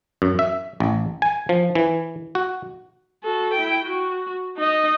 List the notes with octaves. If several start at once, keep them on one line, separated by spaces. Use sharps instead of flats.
F#2
E5
A1
G#5
F3
E3
F#4
F#4 A4
E4 G5
F#4
D#4 D#5